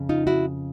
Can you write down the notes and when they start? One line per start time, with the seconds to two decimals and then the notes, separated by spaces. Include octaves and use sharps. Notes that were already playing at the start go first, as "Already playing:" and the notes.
Already playing: F2 C#3
0.09 D#4 F4
0.27 E4 F#4